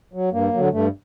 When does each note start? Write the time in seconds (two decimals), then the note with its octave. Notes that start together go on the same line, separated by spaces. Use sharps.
0.13 F#3
0.33 G2 A#3
0.53 D3 F#3
0.72 G2 A3